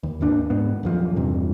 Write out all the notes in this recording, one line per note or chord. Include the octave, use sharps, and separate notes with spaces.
D#2
G#1 D#2 D4
G#2 B3
D#1 F#2 F3
E2 G2 C3